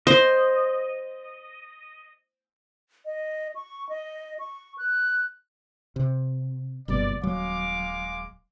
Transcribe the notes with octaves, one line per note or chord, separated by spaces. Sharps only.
C5 D#5
D#5
C#6
D#5
C#6
F#6
C3
F#1 G2 B2 D5
D#1 F#3 G#3 F5 D6